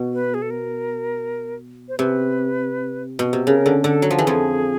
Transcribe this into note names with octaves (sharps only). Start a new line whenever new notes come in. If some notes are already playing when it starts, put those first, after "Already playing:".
Already playing: B2
B4
G#4
A4
A#4
C5
C3 B4
B2
C3
C#3 A#4
D3
D3 A4
F#3
F3
E3 G4 G#4
F2 F3